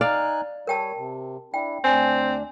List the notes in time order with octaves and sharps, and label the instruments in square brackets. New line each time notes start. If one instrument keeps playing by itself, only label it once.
[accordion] D#4 G#5 F#6 [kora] D5 F5
[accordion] G3 C#5 [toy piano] A#4 G5 A5
[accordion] C3
[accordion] D4 E4 [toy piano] G5
[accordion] D2 D4 [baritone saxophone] C4 [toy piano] G#5